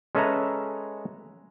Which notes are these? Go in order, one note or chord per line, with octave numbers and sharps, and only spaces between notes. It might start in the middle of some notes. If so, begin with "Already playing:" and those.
G#3 C#4 A4 B4 E5 A#5